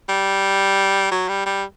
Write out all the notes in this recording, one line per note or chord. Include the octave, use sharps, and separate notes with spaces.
G3
F#3
G3
G3